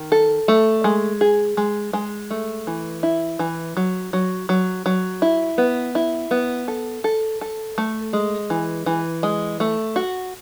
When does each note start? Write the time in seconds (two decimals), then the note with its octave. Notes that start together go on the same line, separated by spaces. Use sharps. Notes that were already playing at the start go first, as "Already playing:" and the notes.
Already playing: D#3
0.12 A4
0.48 A3
0.84 G#3
1.21 G#4
1.57 G#3
1.93 G#3
2.31 A3
2.67 E3
3.03 E4
3.39 E3
3.77 F#3
4.13 F#3
4.49 F#3
4.86 F#3
5.22 E4
5.58 B3
5.95 E4
6.31 B3
6.68 A4
7.04 A4
7.41 A4
7.78 A3
8.13 G#3
8.50 E3
8.86 E3
9.23 G#3
9.60 A3
9.96 F#4